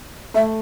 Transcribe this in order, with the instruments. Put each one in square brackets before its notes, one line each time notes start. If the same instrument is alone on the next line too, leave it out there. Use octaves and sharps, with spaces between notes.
[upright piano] A3 [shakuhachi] E5